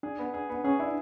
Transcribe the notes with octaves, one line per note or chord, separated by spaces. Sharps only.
D4 G#4
B3
G#4
B3
C#4 G#4
D4 E4